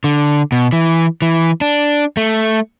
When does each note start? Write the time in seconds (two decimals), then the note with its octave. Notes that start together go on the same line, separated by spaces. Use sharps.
0.04 D3
0.52 B2
0.72 E3
1.22 E3
1.61 D4
2.17 A3